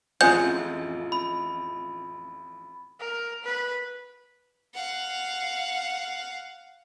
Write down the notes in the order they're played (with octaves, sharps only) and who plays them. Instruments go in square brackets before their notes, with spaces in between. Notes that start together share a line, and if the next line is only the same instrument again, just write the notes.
[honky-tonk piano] A1 F2 F4 [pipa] G#3 G#4 F#5 [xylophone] G6
[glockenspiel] B5
[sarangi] A#4
B4
[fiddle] F5 F#5